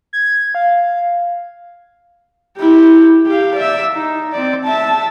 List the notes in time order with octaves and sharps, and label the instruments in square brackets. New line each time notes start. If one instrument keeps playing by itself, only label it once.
[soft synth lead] G#6
F5
[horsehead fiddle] E4 G4
G4 F5
D5 E5
D#4
C4 D5
E5 A5